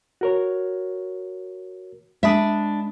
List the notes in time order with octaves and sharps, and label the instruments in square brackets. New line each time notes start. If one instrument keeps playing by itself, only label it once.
[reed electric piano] F#4 A#4 C#5
[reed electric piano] G#3 B5 D#6 [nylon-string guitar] D4 E5